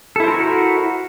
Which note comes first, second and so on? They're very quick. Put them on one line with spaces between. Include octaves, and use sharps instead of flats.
A4 E4 C5 A#4 F#4